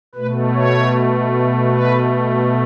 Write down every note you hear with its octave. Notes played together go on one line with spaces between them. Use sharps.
B2 A3 B4
C#5
B4